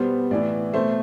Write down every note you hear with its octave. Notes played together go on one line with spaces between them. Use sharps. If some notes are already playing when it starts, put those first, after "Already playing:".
Already playing: B2 G3 B3 C5
A2 E3 B3 D5
B2 A3 C5